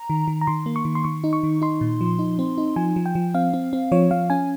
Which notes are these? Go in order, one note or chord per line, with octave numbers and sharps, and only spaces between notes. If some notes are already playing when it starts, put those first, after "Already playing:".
Already playing: A#5
D#3
D#3
A#5
D#3 C6
A#3
C#6
D#3
C6
D#3 C#6
D#4
C#6
D#3
D#4 C6
A#2
F3
D#4
C4
D#4
F3 G#5
F3
G5
F3
C4 F5
C4
C4
F3 C#5
F3 F5
C#4 G#5